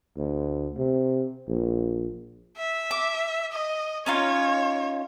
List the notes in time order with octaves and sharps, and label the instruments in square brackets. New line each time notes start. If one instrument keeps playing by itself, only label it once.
[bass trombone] D2
C3
A#1
[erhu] E5
[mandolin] D6
[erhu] D#5
[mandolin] C#4 D#4 F4 [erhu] C#5